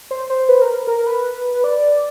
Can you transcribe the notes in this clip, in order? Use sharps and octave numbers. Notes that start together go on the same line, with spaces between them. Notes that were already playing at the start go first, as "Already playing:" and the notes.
C5
C5
B4
A#4
A#4
B4
D5